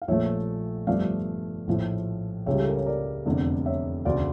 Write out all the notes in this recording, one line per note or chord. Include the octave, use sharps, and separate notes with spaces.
F5
A#1 A#2 F3 A3 C#5 E5
G1 G2 F3 A3 D5 F5
A#1 A2 F3 A3
C#2 C#3 G3 C#5 E5
A4
A#4
C#5
A#4 D5
F1 E2 D3 A3
C#5 E5
E1 D2 C#3 D5 F5